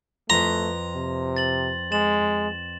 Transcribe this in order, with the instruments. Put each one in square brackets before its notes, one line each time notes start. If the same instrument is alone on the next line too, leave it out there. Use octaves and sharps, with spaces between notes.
[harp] F2 B4 [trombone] A3 [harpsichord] A#5 [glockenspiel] C6
[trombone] C3
[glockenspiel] A6 F#7
[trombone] G#3 [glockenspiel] A6 E7 F#7